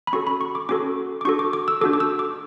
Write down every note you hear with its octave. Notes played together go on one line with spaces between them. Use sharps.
B5
C#4 F#4 A4 C#6
B5
C#6
D6
C#4 F#4 A4 D6
D6
D4 F#4 A4 C#6
D6
D6
E6
D4 F#4 A4 D6
D6
E6
D6